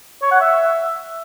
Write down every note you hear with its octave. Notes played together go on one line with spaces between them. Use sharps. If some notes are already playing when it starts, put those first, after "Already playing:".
C#5
F#5
E5